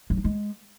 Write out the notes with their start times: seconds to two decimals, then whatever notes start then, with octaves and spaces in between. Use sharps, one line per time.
0.10 F#3
0.17 D4
0.24 G#3